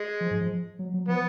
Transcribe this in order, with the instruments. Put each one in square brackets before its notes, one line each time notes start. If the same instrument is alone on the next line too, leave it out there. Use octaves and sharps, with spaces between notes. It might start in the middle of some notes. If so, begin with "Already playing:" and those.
Already playing: [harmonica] G#3
[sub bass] F3
G#2
F3
F#3
F#3
[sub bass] F3 [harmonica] B3